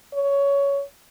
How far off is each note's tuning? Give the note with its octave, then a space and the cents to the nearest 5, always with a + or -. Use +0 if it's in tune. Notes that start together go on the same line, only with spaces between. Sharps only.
C#5 +15